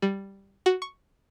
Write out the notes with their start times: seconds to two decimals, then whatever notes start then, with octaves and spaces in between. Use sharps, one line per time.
0.02 G3
0.66 F#4
0.82 C#6